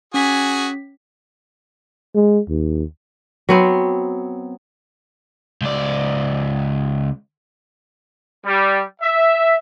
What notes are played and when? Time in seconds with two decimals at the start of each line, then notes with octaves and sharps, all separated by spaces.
0.14 C#4 F#4 G#4 G#5 B6
2.15 G#3
2.49 D#2
3.49 F#3 B3 C4
5.62 C#2 D5
8.46 G3
9.02 E5